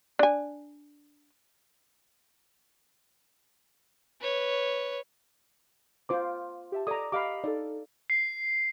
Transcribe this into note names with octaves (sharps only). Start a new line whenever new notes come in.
D4 G#5
B4 C#5
F4 C5 D6
G4 E5 A5
A4 D5 A#5 D6 D#6
G4 D#5 F5 B5 D6
D#4 A4 D5
C7